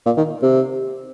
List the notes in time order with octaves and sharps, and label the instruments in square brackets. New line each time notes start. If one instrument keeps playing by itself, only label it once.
[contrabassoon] A#2
D#3
C3